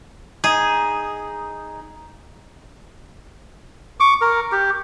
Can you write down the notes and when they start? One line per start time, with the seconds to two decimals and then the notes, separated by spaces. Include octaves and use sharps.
0.44 D#4 G#4
4.00 C#6 D6
4.21 A#4
4.52 G4